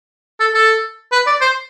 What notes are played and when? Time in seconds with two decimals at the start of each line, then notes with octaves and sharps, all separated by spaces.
0.40 A4
0.55 A4
1.12 B4
1.27 D5
1.41 C5